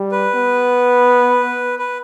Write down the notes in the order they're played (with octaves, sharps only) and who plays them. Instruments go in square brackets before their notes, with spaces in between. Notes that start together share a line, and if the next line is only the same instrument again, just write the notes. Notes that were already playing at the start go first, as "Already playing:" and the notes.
Already playing: [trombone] G3
[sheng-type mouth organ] B4
[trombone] B3
[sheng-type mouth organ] B4